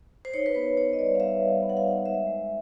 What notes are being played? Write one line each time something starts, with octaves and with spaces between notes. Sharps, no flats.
C5
D#4 C#5
B4
B3 C5
D#4 C#5
D#5
G3 D5
F5
G3 E5
G3
F5
B3
F#5
F5
D#4
G#3 E5
G#3